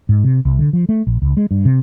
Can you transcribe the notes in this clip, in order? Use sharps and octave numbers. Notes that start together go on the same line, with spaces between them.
G#2
C3
C2
D3
F3
A3
A#1
C#2
G#3
G2
C3